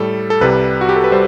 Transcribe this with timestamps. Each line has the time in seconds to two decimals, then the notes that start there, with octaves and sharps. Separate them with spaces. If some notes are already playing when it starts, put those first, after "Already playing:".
Already playing: A2 G3 A4
0.30 A4
0.41 C2 C3 G3 B4
0.81 F#4
0.89 G4
0.96 A4
1.04 B4
1.12 G3 C5